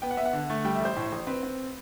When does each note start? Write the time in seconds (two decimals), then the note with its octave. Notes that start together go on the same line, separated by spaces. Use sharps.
0.02 B3 G5
0.11 F#5
0.17 B3 E5
0.25 F#5
0.33 D3
0.50 A3
0.65 G3 G5
0.75 E5
0.81 A1 C5
0.97 A2
1.12 A1
1.27 C4 B4
1.43 C4